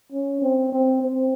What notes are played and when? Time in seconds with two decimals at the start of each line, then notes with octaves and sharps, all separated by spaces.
0.12 C#4
0.42 C4
0.72 C4
1.02 C4